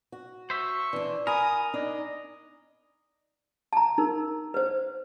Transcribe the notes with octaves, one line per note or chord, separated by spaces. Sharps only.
F#4
C5 E5 C#6
E3 D4 D5
A#4 G#5 B5 D#6
D4 D#4 D#5
A5 A#5
D#4 A#4
B4 C5